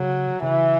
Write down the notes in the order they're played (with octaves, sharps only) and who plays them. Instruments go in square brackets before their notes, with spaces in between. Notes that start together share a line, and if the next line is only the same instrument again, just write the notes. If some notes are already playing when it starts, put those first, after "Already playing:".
Already playing: [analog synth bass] C#3 [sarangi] F#3
[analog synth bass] C#3 [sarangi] E3